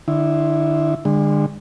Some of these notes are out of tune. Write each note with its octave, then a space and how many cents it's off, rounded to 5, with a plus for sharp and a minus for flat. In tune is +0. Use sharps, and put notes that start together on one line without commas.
D3 +35 E4 +0
D3 +25 G#3 -35